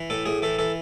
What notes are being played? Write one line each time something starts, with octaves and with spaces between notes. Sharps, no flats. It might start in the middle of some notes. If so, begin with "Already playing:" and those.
Already playing: E3
A2 A4
A2 G#4
E3 A4
E3 A4